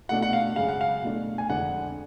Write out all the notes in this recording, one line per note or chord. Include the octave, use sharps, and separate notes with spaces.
B2 A3 D4 F#5
F#5
F5
F#2 C#3 G#3 F5
F#5
F5
B2 A3 D4
G#5
F2 D3 G#3 D4 F#5